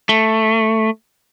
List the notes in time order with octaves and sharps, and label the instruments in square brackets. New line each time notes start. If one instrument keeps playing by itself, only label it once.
[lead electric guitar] A3